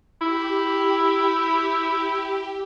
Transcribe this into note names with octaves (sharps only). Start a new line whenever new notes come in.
E4 G4